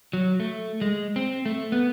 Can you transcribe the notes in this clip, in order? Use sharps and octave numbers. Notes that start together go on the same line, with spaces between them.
F#3
A3
G#3
C4
A3
B3